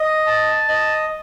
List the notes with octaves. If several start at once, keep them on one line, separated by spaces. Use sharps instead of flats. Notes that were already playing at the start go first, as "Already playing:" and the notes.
Already playing: D#5
A5
D#5